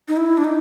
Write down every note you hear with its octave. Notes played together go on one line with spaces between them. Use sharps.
D#4
E4
D4
D#4